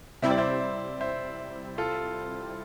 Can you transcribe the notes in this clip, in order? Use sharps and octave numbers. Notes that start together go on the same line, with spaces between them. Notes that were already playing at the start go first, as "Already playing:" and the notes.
C3 G3 C4 E4 E5
D5
C5 E5
C5 E5
F4 A4